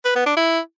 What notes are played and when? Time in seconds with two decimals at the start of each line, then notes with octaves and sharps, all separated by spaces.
0.05 B4
0.15 B3
0.26 D4
0.37 E4